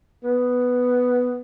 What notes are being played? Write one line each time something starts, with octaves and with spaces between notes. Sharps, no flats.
B3